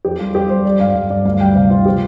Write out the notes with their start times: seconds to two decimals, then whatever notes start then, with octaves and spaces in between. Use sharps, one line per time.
0.05 F2 G4
0.19 G3 F4
0.34 F2 G4
0.50 G3 C5
0.65 G3 D5
0.80 G2 F5
0.95 G2
1.10 G2 D5
1.25 D2 F5
1.41 G3 G5
1.56 C3 F5
1.70 C3 F4
1.86 F3 G4